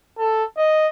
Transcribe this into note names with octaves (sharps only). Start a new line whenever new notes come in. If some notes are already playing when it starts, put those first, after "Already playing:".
A4
D#5